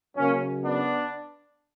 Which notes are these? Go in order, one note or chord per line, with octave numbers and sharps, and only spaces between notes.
F#2 C#3 F#3 A#3 C#4
B3 D4